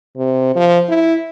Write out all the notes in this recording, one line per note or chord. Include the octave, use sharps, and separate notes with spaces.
C3
F3
E4